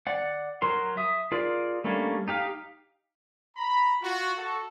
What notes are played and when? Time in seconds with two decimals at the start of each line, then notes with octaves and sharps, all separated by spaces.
0.07 D5 F#5
0.62 F#3 A#4 C6
0.97 E5 D#6
1.32 F4 G#4 A#4 D5
1.84 G3 A3 A#3 C#4 D4
2.28 D#4 G4 F5
3.57 A#5 B5
4.02 F4 F#4
4.37 F#4 A4